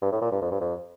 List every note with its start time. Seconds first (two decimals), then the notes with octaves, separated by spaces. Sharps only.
0.02 G2
0.12 A2
0.21 A#2
0.31 G2
0.41 F2
0.51 G2
0.61 F2